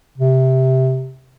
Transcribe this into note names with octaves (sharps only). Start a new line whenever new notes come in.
C3